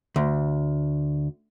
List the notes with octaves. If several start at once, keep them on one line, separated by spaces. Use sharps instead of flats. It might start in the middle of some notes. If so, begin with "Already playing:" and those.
D2